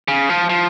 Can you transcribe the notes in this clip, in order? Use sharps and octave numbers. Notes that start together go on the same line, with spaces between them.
C#3
F3
F3